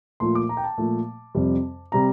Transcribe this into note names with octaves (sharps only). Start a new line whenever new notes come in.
A#2 F3 A3 C6
D6
A#5
G5
A5
A#2 F3 A3
F2 C3 G3
C3 G3 A#5